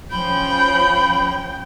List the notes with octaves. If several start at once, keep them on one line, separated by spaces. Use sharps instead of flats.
F3 C#4 G5 B5